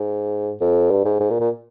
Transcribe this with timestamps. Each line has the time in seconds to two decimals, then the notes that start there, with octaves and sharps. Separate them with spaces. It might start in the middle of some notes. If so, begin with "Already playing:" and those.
Already playing: G#2
0.61 F2
0.91 G2
1.05 G#2
1.20 G#2
1.30 A#2
1.40 A#2